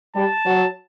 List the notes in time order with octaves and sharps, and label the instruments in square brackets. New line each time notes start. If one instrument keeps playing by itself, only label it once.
[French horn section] G3 [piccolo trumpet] A5
[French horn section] F#3